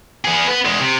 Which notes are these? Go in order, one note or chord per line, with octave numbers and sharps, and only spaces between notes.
B3 G#4
B3 B4
E2 G#3
C3